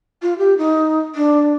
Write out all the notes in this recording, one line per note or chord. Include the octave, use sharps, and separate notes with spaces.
F4
G4
D#4
D4